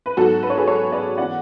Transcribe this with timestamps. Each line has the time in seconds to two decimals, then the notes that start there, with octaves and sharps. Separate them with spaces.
0.06 B4
0.17 G#2 F#3 B3 F#4 A4
0.43 B4
0.50 C#5
0.57 G#4 B4
0.67 A4 C#5
0.92 B4 D5
1.17 E3 B3 D5 F#5